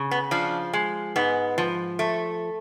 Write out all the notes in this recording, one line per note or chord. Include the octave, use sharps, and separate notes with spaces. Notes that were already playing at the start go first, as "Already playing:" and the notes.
Already playing: C#3
B3
F3 D4
G#3
G#2 B3
F3
A3